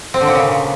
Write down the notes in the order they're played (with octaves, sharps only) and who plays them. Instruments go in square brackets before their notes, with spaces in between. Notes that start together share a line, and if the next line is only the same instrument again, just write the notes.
[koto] C4
D3
A#2
C#3